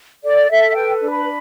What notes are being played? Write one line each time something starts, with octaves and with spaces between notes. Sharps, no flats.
A4 D5
A4 E5
B4 G5
D4
B5